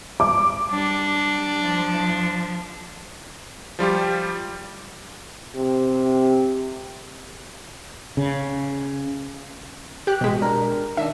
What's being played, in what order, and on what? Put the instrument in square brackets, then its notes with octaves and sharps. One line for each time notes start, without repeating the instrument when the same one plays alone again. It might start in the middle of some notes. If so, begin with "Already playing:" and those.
[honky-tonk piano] D6
[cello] G3 [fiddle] D4
[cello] F3
[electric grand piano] F3 G3 F4 G4
[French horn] C3
[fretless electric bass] C#3
[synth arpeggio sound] G4 F#6 [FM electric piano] G5
[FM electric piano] A1 B6 [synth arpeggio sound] B2 G#3
[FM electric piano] D4 A#4
[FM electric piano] D#3 D4 [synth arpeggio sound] E5